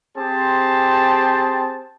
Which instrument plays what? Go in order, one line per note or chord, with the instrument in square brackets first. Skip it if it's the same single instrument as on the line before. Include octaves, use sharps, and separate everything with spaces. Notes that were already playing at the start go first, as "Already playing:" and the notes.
[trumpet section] C4 G4 G#4 C5 A5